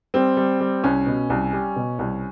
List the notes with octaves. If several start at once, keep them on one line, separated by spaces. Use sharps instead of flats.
G3 C4
G3
G3
C2 C#4
B2
C2
G3
B2
C2